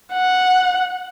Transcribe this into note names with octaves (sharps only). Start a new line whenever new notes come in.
F#5